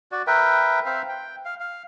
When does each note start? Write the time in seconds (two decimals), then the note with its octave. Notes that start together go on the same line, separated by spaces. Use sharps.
0.12 F#4 D5
0.27 A#4 B4 E5 G5
0.86 C4 C5 E5 F5
1.09 G5
1.45 F5
1.60 F5